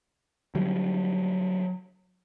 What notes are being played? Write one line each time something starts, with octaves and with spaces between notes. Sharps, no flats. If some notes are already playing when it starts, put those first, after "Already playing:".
D3 F#3 G3